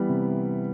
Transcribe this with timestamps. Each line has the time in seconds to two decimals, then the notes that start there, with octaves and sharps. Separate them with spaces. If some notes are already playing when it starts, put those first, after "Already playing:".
Already playing: E3 G3 B3
0.09 C3